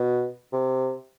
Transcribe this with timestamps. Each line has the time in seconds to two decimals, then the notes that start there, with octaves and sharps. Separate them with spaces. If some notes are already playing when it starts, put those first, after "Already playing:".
Already playing: B2
0.53 C3